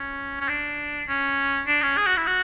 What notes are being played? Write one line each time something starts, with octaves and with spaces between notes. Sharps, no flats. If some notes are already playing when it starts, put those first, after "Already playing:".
Already playing: C#4
C#4
D4
C#4
D4
C#4
G#4
F#4
E4
F#4